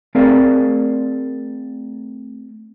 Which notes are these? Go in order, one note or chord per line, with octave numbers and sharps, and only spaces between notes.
A3 C4 G#4 A#4 D5 F5